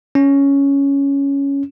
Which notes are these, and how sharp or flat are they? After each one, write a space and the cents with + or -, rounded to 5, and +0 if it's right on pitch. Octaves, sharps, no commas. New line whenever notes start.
C#4 +5